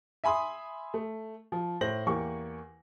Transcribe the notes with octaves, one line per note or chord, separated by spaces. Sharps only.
E5 G#5 B5 C6 D#6
A3
F3
A2 C5 A#6 F#7
E2 A#3 G4 C#6